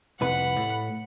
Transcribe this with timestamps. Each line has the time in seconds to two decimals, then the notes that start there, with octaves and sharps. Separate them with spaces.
0.21 C2 F2 B4 F#5 B5
0.57 A2